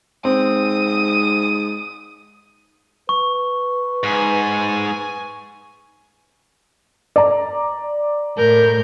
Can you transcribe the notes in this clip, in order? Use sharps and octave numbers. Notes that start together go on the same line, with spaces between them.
G#2 C4 D#6
B4 C#6
G#2 G#5
D5 A#5
A2 A#4 G6